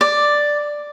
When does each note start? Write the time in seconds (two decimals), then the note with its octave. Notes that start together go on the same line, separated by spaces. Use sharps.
0.01 D5